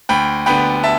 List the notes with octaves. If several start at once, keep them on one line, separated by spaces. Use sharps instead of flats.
D2 G5 B5
D3 B3 G5 B5
E5 A5